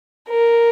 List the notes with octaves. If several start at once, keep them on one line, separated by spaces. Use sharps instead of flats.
A#4